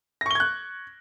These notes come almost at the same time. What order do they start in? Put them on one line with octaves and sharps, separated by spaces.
A#6 C#6 G7 G#6 F#6